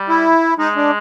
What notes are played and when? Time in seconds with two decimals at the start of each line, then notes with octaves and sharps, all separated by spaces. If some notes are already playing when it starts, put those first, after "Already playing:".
Already playing: G3
0.09 E4
0.58 G#3 D#4
0.76 D4